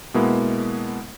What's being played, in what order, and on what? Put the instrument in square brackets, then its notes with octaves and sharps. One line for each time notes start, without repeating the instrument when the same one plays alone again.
[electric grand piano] B2 G#3 A#3 B3 E4